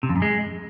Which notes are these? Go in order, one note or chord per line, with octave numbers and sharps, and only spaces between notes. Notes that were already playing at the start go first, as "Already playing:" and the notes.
C3
F2
F#2
G#3